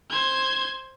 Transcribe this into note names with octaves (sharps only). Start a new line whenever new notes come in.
C5 G#6